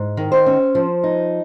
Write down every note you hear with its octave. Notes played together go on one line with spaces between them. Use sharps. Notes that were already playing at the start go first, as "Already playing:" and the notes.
Already playing: G#2
D#3
C5
C#4
F3
D#4